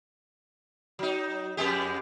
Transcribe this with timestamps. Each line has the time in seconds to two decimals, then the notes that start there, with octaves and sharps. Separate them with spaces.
0.99 F#3 D#4
1.57 F2 G#3 G4